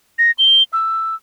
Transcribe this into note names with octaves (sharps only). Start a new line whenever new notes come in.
A#6
G7
E6